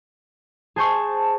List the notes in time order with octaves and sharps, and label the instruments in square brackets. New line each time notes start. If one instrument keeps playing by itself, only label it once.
[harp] G#4 C5 C#6 [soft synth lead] A5